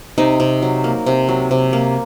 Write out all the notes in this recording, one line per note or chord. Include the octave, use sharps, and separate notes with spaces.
C3 D#4
C3
F#3
A#3
C3
F#3
C3
A#3